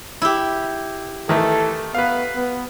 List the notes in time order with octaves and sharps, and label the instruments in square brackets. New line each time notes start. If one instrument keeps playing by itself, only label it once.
[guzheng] E4 G4
[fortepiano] D#3 A3 [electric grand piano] E3 [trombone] A4
[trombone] B3 [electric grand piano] B4 F5
[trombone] B3